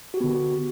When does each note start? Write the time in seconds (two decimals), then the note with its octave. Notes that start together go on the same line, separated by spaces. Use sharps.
0.14 F#4
0.17 G4
0.21 B3
0.24 D3